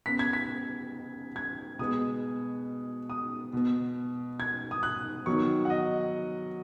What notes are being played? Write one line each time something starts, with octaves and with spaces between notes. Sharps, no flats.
C#3 B3 B6
G#6
B6
G#6
B2 G#3 B3 D#6
D#6
B2 B3
G#6
D#6
F#6
D#3 F#3 B3 C#6
F#5
D#5